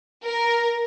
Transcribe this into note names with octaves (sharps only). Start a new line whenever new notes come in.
A#4